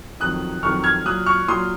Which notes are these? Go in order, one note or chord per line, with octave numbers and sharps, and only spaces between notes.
F2 D#3 F#3 D#6 F#6
F2 D#3 F#3 C#6 F6
F6 G#6
A#2 F#3 D#6 F#6
C#6 F6
A#2 F#3 C6 D#6